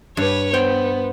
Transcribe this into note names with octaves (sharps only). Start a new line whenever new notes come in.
G2 B4 C#5
B3 C5 G5